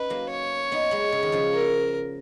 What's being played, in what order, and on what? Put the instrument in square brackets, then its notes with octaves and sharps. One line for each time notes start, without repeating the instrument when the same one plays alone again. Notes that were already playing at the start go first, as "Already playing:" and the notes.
Already playing: [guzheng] C#4 D#4 [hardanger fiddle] B4
[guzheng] F#3 A#3
[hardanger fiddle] C#5
[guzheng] B3 D#4
G#3 B3
C#3
D#3
C#3 F3
[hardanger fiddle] A#4